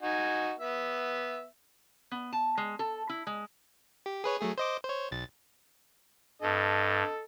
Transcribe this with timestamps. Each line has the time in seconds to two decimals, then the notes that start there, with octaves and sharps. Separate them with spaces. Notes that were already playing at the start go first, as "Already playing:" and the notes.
0.02 D#4 F#4 G#5
0.59 B3 E5
2.11 B3
2.32 A5
2.58 G#3
2.79 A4
3.09 E4
3.27 G#3
4.06 G4
4.24 G#4 B4 C#5
4.40 F#3 A3 G#4
4.58 C5 D#5 D6
4.85 C5 C#5
5.11 B1 A6
6.42 G2 A4 D#5